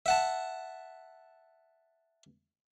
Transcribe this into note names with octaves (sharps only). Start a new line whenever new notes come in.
E5 F#5 A5